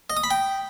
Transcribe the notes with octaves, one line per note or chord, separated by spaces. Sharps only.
D#5
D#6
B5
G5